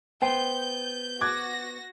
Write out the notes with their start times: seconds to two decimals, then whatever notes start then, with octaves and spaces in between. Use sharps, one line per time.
0.22 B3 C5 G5 G6
1.21 F#4 D6 F#6 G#6 A#6